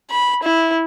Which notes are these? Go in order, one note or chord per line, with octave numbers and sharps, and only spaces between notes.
B5
E4